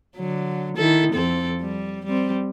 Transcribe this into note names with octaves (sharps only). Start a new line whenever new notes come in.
D3 F#3
D#3 E4 A4
F2 C4 A4
G3
G3 C4